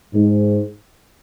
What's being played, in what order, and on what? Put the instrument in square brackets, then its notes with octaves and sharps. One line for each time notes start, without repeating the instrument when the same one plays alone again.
[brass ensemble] G#2